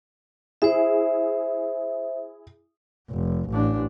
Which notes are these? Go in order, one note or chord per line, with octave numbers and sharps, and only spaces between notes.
E4 G#4 C5 E5
F1
A1 D4